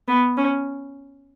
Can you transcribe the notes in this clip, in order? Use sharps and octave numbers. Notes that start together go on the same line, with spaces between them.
B3
C#4